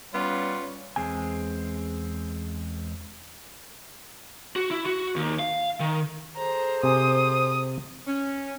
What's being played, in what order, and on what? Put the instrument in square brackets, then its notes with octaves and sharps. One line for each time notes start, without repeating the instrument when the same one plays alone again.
[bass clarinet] G3 [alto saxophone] B3 [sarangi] C#4 [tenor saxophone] F4
[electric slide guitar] E2 G#3 C4 G#5
[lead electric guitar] F#4
E4
F#4
D#2
F5
D#3
[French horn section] G#4 A4 C5 [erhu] A#5
[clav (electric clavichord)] C3 G#5 [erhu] D#6
[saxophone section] C#4